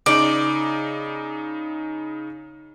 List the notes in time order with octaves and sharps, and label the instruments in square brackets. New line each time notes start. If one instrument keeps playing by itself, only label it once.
[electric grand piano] C#3 D#4 [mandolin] D5